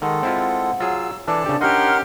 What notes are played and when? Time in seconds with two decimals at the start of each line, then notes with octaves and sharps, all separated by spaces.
0.02 D#3 G#3 A4 F#5
0.23 C4 E4 F4
0.80 F#3 F4 G#4 E6
1.28 E3 D4 A4 D5 A5
1.46 C#3 D4 G4
1.61 C#4 D#4 G4 A#4 F#5 C6 F6